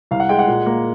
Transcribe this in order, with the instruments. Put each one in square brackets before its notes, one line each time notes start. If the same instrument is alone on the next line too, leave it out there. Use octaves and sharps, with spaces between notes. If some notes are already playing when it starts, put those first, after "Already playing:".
[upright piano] C2 F5
F#5
G#3 G5
F#5
A#2
A#3